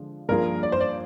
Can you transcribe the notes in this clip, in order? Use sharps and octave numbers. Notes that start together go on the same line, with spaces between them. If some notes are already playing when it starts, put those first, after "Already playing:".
Already playing: D3 F3 G#3
G2 F3 A#3 F4 G#4 A#4
D5
C5
D5